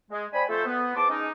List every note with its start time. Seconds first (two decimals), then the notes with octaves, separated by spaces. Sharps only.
0.11 G#3
0.33 C5 D5 G5 G#5 B5
0.49 F2 A3 A4 C5
0.66 B3
0.96 E2 C5 A5 C6 D6
1.09 G#3 C#4 D#4